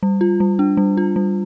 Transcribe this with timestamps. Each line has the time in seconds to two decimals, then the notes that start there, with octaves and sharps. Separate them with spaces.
0.03 G3
0.21 F4
0.40 G3
0.59 D4
0.77 G3
0.97 F4
1.16 G3